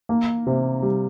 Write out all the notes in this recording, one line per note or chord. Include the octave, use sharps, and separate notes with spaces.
A#3
C3
G3